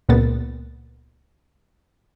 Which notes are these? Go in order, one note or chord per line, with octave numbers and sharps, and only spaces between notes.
C#2 A#2 B3 A6